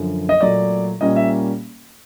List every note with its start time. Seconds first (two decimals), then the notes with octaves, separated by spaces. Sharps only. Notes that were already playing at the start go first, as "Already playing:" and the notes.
Already playing: F#2 D3 F3
0.29 D#5
0.41 A#2 F#3 A3 D5
1.00 A#2 G3 A#3 C#4 D#5
1.16 E5